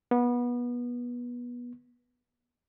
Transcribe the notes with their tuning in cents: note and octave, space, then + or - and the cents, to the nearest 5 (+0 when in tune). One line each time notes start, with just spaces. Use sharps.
B3 -25